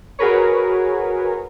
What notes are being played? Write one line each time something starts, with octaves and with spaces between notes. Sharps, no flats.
F#4 G#4 A#4 B4 C#5